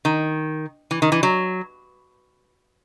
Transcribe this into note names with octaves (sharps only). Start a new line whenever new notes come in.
D#3
E3
D#3
E3
F#3